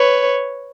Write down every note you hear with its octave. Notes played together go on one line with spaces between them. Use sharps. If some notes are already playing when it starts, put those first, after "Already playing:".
Already playing: B4 C#5